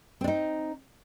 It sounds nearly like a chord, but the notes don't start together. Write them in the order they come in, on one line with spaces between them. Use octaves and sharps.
C4 D4 D#4